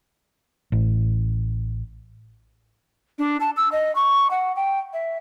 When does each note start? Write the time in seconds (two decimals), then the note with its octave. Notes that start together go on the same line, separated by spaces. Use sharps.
0.72 A1
3.19 D4
3.40 A5
3.57 E6
3.72 D#5
3.95 C#6
4.31 F#5
4.56 G5
4.93 E5